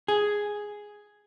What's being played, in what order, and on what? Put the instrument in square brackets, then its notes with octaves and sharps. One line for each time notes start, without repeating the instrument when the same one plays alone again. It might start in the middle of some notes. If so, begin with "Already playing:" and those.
[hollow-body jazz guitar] G#4